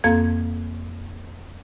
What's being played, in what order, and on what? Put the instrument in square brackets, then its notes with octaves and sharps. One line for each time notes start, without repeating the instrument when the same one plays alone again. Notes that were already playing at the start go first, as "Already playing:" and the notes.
[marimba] F2 A#3 C4 A4 F5 G#6